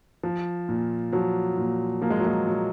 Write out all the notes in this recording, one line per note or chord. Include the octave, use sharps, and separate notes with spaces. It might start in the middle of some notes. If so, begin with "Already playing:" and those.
F3
A#2
F3 F#3
A#2
F3 A#3
G#3
F#3
G#3
A#2 F#3